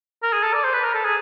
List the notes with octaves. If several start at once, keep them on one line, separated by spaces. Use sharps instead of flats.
A#4
G#4
A4
D5
C5
B4
A#4
A4
G#4